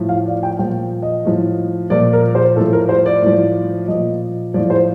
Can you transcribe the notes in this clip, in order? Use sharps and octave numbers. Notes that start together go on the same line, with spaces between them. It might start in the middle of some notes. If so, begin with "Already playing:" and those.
Already playing: A2 F3
F5
D5
G5
A#2 F3 G5
D#5
A2 F3
A#2 F3 D5
A#4
C5
A2 F3 A4
A#4
C5
D5
A2 F3
A#2 F3 D#5
A2 F3 D5
C5